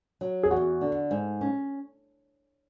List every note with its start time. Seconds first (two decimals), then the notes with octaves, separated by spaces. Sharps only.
0.21 F#3
0.43 G#4
0.51 E2 F#4
0.81 D3
1.11 G#2
1.41 C#4